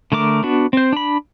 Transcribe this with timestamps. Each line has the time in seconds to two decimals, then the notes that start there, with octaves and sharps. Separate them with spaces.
0.12 D3 A3 A#4 D6
0.43 B3 D4 F#4
0.73 C4 C5
0.93 D4 B5